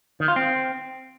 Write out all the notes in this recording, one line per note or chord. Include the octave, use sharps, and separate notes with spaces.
D#3
F4
C4